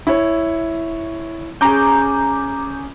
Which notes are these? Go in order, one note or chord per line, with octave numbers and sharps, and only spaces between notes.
E4 C#5
C#4 G#4 A#5 D6 G6